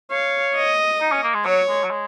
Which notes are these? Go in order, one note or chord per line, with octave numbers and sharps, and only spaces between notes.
C#5 F5
D#5
D#4
C#4
A#3
G#3
F#3 C#5
G#3
F#3
G#3